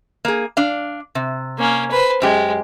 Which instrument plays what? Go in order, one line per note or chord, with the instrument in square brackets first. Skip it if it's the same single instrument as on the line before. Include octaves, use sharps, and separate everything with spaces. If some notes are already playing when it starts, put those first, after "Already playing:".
[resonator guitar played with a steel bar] A#3 G#4
D4 F5
C3
[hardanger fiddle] A#3 C#4
B4 C5
[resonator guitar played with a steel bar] F#2 G4 [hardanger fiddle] G#3